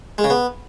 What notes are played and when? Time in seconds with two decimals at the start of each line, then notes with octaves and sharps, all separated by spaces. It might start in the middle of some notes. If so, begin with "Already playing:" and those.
0.18 G#3
0.24 C#3
0.30 B3